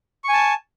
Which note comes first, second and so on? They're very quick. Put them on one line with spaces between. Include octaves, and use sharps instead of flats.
C#6 G#5 A5